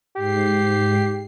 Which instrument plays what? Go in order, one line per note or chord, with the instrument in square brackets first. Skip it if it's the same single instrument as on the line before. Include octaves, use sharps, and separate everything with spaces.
[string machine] G#2 C7 [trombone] G4